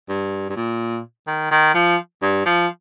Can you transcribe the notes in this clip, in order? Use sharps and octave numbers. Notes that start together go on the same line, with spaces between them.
G2
G2
A#2
D#3
D#3
F3
G2
F3